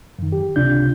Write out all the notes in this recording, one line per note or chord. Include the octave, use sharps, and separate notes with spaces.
F#2 D#3
G4
C#2 C3 D4 F4 G6